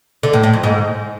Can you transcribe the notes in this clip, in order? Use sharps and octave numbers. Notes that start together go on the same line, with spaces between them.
D3
A2
A2
F2
G#2